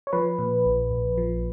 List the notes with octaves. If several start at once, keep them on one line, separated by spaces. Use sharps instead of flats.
C#5
F3 B4
A#2
A#1
A#1
F3